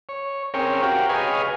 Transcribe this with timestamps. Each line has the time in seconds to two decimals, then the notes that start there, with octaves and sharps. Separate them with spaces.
0.09 C#5
0.54 C4 C#4 G#4 A#4 C#5 G5
0.82 F#4 G4 A#4 F5 G5
1.09 G#4 B4 C#5 D#5 F5 G#5